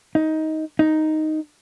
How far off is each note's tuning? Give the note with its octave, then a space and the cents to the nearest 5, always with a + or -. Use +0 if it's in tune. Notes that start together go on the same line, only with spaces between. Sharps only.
D#4 +15
D#4 +0